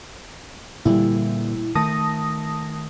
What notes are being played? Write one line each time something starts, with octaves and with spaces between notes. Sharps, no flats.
A#2 D3 E3 G3 E4
D#3 A3 A5 D#6 A#6